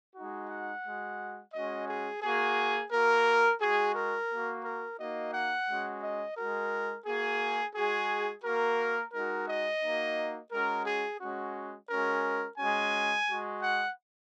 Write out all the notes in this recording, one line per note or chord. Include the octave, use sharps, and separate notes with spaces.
G#3 D#4 F#4
F#5
G#3 F#4
G#3 C#4 F#4 D#5
G#4
A#3 F#4 G#4
A#3 F#4 A#4
G#3 F#4 G#4
A#4
A#3 F#4
A#4
A#3 D#4 F#4 D#5
F#5
G#3 C#4 F#4
D#5
G#3 F#4 A#4
A#3 F#4 G#4
G#3 F#4 G#4
A#3 F#4 A#4
G#3 D#4 F#4 A#4
D#5
A#3 D#4 F#4
G#3 C#4 F#4 A#4
G#4
G#3 C#4 F#4
G#3 C#4 F#4 A#4
G#3 C#4 F#4 G#5
G#3 F#4
F#5